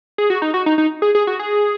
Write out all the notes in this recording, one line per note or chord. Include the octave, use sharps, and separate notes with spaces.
G#4
F#4
D#4
F#4
D#4
D#4
G#4
G#4
F#4
G#4